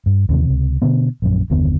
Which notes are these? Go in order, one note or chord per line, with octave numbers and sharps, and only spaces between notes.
G2
D#2 C3 E3
C#2 C3
B2 D3 B3
A#1 F#2
F#1 D#2 D3 B3